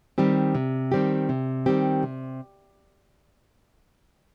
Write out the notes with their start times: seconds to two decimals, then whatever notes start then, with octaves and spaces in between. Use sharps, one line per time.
0.18 D#3 G3 C4 G4
0.55 C3
0.92 D#3 G3 C4 G4
1.29 C3
1.66 D#3 G3 C4 G4
2.03 C3